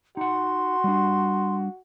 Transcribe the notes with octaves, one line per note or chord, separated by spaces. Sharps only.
D#4 F#4 F#5 C6
G3 D4